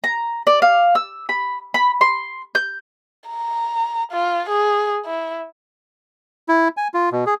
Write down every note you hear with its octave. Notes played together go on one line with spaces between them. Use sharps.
A#5
D5
F5
E6
B5
B5
C6
G6
A#5
F4
G#4
E4
E4
G#5
F4
B2
G#4